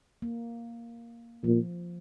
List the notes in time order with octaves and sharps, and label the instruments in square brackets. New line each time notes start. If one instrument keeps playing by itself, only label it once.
[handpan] A#3
[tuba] A#2 [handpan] F3